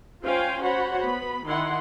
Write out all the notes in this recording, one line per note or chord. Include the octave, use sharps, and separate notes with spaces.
C#4 F4 C5 F5 G5 G#5
F#4 C5 C#5 F#5 B5
B3 B5
D#3 E4 F#5 C6